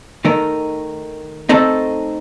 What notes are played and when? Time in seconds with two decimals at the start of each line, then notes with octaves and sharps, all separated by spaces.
0.25 D#3 A3 D#4 A#4
1.49 A3 C4 D#4 A4